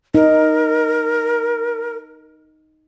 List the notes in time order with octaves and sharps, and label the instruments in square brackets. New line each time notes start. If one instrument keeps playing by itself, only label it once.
[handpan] D#4 [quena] A#4